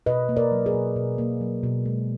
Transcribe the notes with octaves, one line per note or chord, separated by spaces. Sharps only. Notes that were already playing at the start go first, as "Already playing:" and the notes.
B2 B4 D#5
A#3
A#4 D5
F#3
G#4 B4
B2
B2
A#3
F#3
B2
G#3